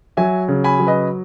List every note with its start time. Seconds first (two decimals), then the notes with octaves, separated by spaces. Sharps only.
0.17 F#3 E5 G#5
0.48 C#3
0.64 G#5 B5
0.80 F#3
0.87 B4 D#5